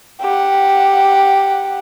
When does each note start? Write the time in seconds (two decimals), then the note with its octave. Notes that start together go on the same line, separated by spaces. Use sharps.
0.20 G4 F#5